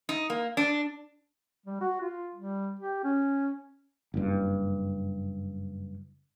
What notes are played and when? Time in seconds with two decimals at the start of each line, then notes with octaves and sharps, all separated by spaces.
0.09 D#4
0.30 A#3
0.57 D4
1.66 G3
1.81 F#4
2.01 F4
2.35 G3
2.79 G4
3.04 C#4
4.14 F#1 G2